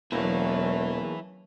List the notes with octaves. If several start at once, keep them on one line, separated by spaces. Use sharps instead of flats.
E1 E2 F#3 A3 A#3 C#4 E4 B4